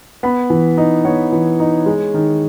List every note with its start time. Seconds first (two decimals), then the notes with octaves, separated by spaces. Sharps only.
0.23 B3 B5
0.50 E3
0.78 D#4
1.05 B3 C#5
1.32 E3
1.60 D#4
1.86 G#3
2.14 D#3